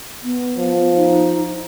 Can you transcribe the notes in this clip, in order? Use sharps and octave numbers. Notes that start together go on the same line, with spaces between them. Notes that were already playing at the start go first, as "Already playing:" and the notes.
B3
F3
D#4